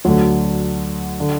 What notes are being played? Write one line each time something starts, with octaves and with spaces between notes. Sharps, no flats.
D2 D3 F#3
D3